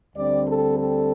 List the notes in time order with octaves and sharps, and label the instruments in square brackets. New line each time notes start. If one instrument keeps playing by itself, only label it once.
[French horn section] D2 D3 G3 C4 D5
A4
A4